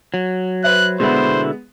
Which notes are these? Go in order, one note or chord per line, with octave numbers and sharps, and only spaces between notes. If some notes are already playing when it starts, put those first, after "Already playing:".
F#3
B4 C5 E5 F#6
B2 D3 G#3 B3 E4 C5